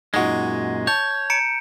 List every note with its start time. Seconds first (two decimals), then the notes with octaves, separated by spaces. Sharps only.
0.14 F#2 A#2 G#3 D#4 F#4
0.87 C#5 A5 G6
1.30 A#5 C#7 D7